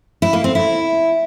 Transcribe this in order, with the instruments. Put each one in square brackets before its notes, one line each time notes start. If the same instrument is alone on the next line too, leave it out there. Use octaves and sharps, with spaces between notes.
[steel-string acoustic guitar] E4
A#3
C4
E4